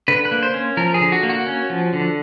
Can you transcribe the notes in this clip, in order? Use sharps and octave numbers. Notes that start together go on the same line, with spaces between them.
D3 B4
B4
A#3
C5
C#4
F3 A#4
G#4
D3
F#4
A#3
F#4
C#4
F3
D3